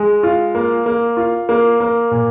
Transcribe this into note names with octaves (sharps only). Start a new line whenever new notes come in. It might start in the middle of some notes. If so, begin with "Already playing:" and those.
Already playing: G#3
F4
A#3
A#3
F4
A#3
A#3
A#2